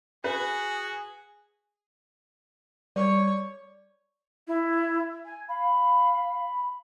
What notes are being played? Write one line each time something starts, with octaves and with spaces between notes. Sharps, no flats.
F#4 G#4 B4
G3 C#5 D5 C#6
E4
G#5
F5 B5